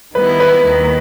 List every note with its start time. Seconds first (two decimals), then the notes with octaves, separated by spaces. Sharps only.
0.15 D#3 G3 B3 E4 B4
0.40 B4
0.66 D#2 D#3 A#3